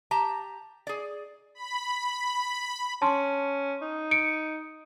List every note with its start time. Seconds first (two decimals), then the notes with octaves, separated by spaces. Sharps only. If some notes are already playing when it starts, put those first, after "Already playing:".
0.11 G4 A5 A#5
0.87 G#4 D5
1.55 B5
3.02 C#4 A5 C6
3.82 D#4
4.11 C#7 D7